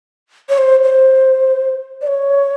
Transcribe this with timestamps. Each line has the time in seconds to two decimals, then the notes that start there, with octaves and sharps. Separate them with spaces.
0.49 C#5
0.58 C5
0.84 C5
2.01 D5
2.07 C#5